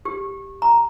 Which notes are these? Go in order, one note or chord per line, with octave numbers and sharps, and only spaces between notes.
G4
A#5